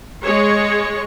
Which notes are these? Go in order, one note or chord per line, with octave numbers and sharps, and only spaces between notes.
G#3 C#5